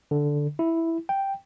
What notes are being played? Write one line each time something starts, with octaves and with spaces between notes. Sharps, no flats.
D3
E4
G5